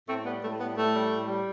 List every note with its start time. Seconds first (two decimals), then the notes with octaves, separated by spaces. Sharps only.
0.08 A2 A3 C4
0.25 G3 B3
0.42 A2 A3
0.59 G3 B3
0.77 A2 A3
0.94 G3
1.10 A2
1.28 G3